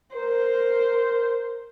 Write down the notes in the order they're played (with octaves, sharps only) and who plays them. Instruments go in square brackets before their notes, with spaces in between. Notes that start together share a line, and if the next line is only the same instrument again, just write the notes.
[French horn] A#4 [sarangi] C5